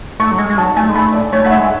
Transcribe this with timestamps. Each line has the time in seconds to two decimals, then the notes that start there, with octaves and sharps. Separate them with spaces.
0.20 A3 C#6
0.31 F#3
0.38 G#3
0.50 G#3
0.57 F#3 A5
0.76 A3 G#5
0.89 G#3
0.95 A3 B5
1.13 D5
1.32 A3 C#5
1.45 A3 F#5
1.50 E5
1.57 G#3